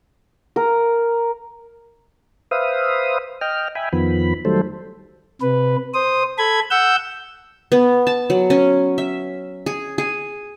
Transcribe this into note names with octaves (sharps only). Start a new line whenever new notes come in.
A#4
B4 C5 E5 F5 D#6
D#5 G5 F6
E5 G5 G#5 B5
F2 D#3 F3 B3 B5
D#3 F#3 G3 A3 A4 C5
C3 B4
C5 D#6
A4 B5 G#6
F#5 E6 G6
B3
A5
F#3
C#4
E5
G#4
G#4